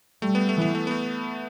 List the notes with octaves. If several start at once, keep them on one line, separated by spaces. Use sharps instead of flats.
G3 A3
B3
A3
E3 B3
A3
B3
A3